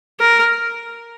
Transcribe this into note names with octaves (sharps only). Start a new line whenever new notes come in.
A#4